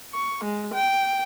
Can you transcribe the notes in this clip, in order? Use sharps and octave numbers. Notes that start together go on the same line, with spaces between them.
C#6
G#3
G5